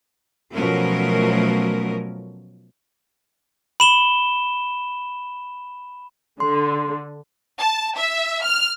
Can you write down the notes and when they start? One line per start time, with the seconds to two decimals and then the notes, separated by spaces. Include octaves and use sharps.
0.54 B2 F3 F#3 A3 C#4 A#4
3.80 B5 E7 G7
6.40 D3 C6
7.59 A5
7.96 E5
8.44 F6